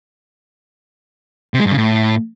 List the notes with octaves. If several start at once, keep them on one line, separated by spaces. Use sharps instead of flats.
C3
G#3
G2
C#3
A2